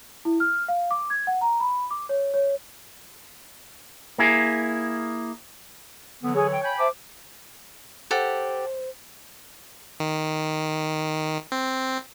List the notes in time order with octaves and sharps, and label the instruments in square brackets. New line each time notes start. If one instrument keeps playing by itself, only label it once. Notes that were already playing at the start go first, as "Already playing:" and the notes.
[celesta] E4
F6
F5
D6
G#6
F#5
A#5
B5
D6
C#5
C#5
[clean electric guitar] A#3 E4 G#4
[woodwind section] D3 E3 F#3 [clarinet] B3
[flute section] G#4 [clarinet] C#5
[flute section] G5
[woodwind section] G5 G#5 B5 [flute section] G6
[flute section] C5 E5 A5 [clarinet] D6
[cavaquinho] G4 A4 F#5 [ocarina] C5
[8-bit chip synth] D#3
C4